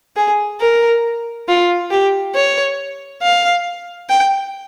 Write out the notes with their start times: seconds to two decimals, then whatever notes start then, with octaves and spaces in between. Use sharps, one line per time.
0.16 G#4
0.60 A#4
1.48 F4
1.91 G4
2.35 C#5
3.23 F5
4.09 G5